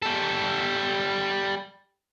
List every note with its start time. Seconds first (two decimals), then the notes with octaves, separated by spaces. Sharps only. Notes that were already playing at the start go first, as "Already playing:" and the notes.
0.03 G3 A4